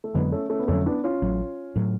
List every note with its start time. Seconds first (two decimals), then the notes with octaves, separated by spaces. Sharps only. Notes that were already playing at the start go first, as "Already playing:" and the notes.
0.04 A3
0.14 F2 D3 F#3 G#3 B3
0.32 A3 C#4
0.50 A3 C#4
0.59 B3
0.68 F2 D3 F#3 A3 C#4
0.86 B3 D4
1.04 C#4 F4
1.22 A1 A2 F#3
1.76 A2 F#3